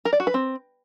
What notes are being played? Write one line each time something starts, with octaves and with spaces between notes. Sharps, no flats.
A#4
D5
F#4
B4
C4